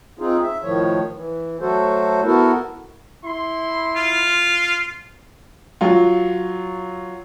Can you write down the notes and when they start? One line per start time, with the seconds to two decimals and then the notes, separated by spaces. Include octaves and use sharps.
0.19 C4 D#4 F4 G#4
0.43 E5
0.63 A2 D#3 F3 C#5
1.15 E3
1.60 F#3 A3 F#4 A4 C5
2.24 B3 E4 F#4 A4 A#4
3.25 E4 C6
3.96 F4
5.81 F#3 F4